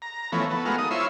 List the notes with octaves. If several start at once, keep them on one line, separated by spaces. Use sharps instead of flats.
A#5
E3 F3 A3 B3 C#4
B3 A4
G#3 A3 B3 F#4 A#4 F5
D#4 D#6
E4 F4 C5 C#5 E5